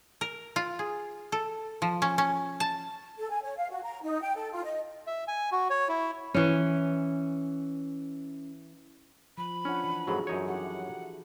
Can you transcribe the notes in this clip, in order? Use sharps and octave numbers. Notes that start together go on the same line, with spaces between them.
A#4
F4
G#4
A4
F3
C#4
C#4
A5
A4
G#5
C#5
F5
F#4
A#5
D#4
G5
A4
F4
D#5
E5
G#5
F#4
C#5
E4
E3 C#4
F3 B5
C#4 D4 F4 F#5
E3
F2 G#2 F#3 F#4 G#4 A4
F#2 D#4 C#5
E4 G4 F#5